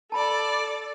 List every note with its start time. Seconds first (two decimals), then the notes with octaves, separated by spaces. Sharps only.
0.12 A4 D5 A5 B5